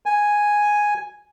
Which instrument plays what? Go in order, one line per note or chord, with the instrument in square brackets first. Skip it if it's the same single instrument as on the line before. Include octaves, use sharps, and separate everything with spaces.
[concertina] G#5